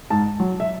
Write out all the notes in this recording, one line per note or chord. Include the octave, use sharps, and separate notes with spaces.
G#2 A5
F#3
E5